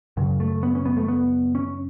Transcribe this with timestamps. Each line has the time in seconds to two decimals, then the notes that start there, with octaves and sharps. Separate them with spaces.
0.17 F#2 C#3
0.40 A3
0.63 B3
0.75 C#4
0.85 B3
0.97 A3
1.08 B3
1.55 C#4